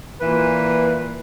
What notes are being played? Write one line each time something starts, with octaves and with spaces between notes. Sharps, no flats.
A#2 E3 B4